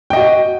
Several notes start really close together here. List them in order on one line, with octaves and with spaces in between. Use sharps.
G5 D#5 F#4